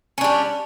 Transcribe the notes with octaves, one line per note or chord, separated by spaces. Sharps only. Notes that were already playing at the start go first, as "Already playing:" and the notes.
G3 C#4 D4